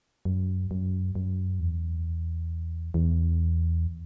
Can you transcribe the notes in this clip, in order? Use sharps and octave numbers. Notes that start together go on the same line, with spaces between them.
F#2
F#2
F#2
E2
E2